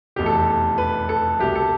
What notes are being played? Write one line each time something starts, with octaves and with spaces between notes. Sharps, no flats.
F1 E2 B2 G4
A4
B4
A4
C2 B2 G4
A4